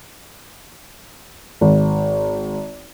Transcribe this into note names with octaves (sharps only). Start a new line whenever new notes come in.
G#1